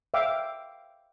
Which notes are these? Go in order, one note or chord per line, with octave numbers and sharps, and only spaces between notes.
E5 F5 G5 D6